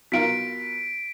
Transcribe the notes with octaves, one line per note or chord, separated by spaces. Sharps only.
B2 F4 A#4 B6 D7